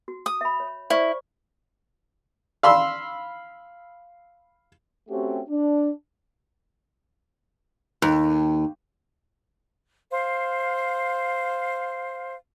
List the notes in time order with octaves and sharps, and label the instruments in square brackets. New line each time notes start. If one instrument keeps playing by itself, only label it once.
[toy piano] F#4
[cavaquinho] D#6
[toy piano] E5 B5
C#5
[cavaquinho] E4 [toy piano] C5 D5 C#6
[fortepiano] F5 B5 C6 E6
[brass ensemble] A3 C4 C#4 F#4 G4
D4
[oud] D#2
[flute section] C5 F5